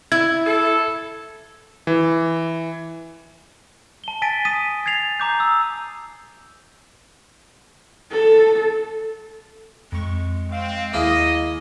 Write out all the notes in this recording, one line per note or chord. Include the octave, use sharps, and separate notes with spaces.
E4 G#6
A4
E3
A5 G7
G#5 A6 B6 D7 D#7
D#6 B6 D#7
G#6 A6 C7 F7
A#5 D6 G6
D#6 E6
A4
F2 G#3 C#6
C4 F5
D#2 A#3 E4 G#4 D#5